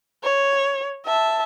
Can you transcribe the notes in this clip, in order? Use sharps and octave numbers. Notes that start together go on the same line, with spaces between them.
C#5
E5 A5